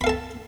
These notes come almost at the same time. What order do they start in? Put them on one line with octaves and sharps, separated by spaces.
B5 F5 A4 A5